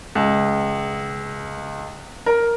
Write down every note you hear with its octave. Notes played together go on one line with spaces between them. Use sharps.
C#2
A#4